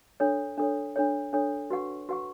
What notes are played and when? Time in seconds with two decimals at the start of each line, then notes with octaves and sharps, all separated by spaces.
0.20 D4 A4 C#5
0.58 D4 A4 C#5
0.96 D4 A4 C#5
1.33 D4 A4 C#5
1.70 F#4 B4 F#5 C#6
2.09 F#4 B4 F#5 C#6